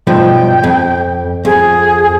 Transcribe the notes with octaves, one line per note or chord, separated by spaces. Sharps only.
B1 G2 F3 G5
F2
F2 G#4